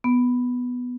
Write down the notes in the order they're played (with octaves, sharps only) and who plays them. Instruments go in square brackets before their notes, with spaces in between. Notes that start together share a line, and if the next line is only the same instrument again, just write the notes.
[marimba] B3